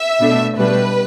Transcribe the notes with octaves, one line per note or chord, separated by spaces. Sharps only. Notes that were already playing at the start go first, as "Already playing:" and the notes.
Already playing: E5
B2 A3 D4
B2 G3 D4 B4